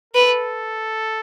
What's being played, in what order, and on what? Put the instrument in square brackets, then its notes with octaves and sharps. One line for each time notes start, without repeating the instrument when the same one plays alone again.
[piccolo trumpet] A4 [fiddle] B4